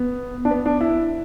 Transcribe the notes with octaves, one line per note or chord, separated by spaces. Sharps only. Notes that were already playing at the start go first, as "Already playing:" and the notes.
Already playing: B3
D4
B3
D4
E4